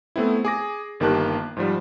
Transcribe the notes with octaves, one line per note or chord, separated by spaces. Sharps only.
A3 B3 C4 E4
G#4 D6 A#6
G1 D#3 A#3 G4 A5 F#6
G#2 F3 G3